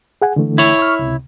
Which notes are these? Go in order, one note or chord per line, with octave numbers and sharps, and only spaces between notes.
G#4 F#5 G#5
D3 E3 A3
E4 C#5
C#6 F6
C#2 C3